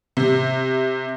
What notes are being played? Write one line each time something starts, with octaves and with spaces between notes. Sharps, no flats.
C3